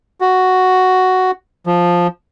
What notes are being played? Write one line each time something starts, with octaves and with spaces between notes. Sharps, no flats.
F#4
F3